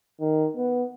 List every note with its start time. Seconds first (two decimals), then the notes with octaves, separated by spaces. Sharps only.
0.20 D#3
0.57 B3